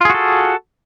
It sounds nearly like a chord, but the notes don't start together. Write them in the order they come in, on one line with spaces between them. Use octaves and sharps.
F4 G#4 F#4 A4